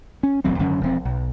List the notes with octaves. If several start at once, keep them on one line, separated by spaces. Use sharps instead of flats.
C#4
D#1 A1 F#3 C4
G#1 F#2 D3 C#4
E1 F3 C4
B1